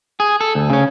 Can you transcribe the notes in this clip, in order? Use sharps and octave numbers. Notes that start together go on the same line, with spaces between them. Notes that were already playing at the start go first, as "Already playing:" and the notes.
G#4
A4
D2
C#3 C#4